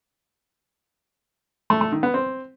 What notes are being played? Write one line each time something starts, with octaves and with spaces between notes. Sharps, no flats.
A3
A3
D#3
B3
C4